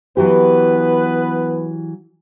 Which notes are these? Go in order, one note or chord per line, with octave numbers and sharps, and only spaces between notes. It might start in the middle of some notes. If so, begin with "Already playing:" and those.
E3 F#3 B3 G4 B4